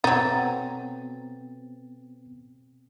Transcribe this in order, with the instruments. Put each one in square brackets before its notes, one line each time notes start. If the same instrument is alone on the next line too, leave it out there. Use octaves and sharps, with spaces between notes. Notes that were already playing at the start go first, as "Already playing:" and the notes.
[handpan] B2 C4 A4 [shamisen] F#3 D#4 [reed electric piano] B3 A6